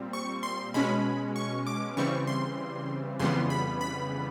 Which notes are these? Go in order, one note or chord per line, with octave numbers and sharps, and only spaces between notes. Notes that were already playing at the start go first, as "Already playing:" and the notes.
Already playing: A#2 G3 C4
C#6
C6
B2 G#3 C#4 B5
C#6
D6
C#3 E3 G3 C4 C#6
C6
F2 C#3 E3 G3 B3 C6
B5
B5